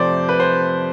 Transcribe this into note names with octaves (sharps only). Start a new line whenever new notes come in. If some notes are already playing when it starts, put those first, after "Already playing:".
Already playing: F2 C3 F3 A3 C5 D5
B4
C5